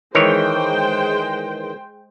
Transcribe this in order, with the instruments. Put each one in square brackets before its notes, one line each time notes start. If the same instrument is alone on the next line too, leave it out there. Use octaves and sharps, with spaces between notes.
[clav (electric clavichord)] D#3 E3 C#5 [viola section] G#3 C5 G5